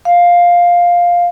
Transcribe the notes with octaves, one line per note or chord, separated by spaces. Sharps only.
F5